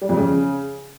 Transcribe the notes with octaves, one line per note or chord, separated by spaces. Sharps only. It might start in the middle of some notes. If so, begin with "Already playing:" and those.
G3
F2
C#3